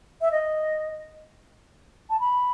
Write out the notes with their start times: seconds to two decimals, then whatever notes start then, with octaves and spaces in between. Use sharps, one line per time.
0.21 E5
0.32 D#5
2.10 A5
2.20 B5